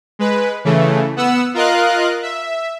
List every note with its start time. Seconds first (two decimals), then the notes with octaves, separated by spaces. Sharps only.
0.19 G#3 B4
0.65 C#3 E3 A3
1.16 B3 F#5 E6
1.54 F4 A#4 D#5 F5 F#6
2.23 E5